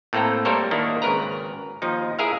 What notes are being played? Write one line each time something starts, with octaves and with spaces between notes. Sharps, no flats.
A2 A3 A#3 C4 A4 A#5
G3 A#3 A4 A#4 C5 C#5
D#3 A#3 D4 E4
G#1 C#3 A#4 B4 A#5
D#2 F3 D#4
E4 G#4 A#4 E5 F5